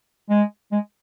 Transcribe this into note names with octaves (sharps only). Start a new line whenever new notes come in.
G#3
G#3